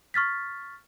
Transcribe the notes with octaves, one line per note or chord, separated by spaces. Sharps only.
C#6 F6 A6 B6